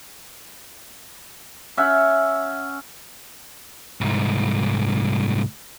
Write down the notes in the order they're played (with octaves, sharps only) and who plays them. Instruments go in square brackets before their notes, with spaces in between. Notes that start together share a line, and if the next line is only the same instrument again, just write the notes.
[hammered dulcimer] C#4 E5 F#5
[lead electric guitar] C2 G#2